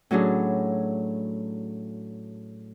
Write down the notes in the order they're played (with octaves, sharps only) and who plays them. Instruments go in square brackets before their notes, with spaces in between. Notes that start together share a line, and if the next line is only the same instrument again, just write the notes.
[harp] A2 F#3 C#4 D4 G#4